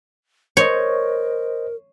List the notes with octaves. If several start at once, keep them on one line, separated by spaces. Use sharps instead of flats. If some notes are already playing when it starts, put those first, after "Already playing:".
A#4 C5 C#5 D#5